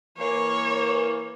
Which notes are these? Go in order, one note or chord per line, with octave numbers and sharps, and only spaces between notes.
E3 A#3 C#5